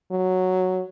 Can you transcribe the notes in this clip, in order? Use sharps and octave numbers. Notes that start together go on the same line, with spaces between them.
F#3